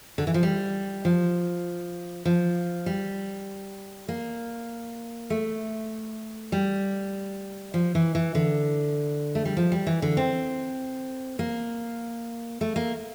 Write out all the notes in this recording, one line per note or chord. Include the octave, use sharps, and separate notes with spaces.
D3
E3
F3
G3
F3
F3
G3
A#3
A3
G3
F3
E3
E3
D3
A3
G3
F3
G3
E3
D3
C4
A#3
A3
A#3